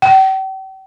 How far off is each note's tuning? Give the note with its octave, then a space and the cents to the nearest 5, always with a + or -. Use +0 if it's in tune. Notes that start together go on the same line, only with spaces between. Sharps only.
G5 -40